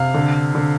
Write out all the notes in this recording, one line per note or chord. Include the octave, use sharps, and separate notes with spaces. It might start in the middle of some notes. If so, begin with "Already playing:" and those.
Already playing: C3 F5
D3
D3